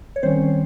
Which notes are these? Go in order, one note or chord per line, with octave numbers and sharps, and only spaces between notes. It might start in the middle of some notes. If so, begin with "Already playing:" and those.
C#5
D#3 G3 C4 C#4 C5